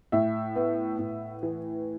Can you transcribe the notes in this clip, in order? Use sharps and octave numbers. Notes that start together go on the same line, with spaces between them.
A2 E5
B3
A2
E3